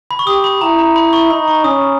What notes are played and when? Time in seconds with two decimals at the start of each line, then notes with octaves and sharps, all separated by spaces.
0.11 B5
0.19 C#6
0.27 G4 D#6
0.44 B5
0.61 E4 A#5
0.79 A#5
0.96 B5
1.13 C#6
1.31 D#4 B5
1.48 C#6
1.64 C#4 D#6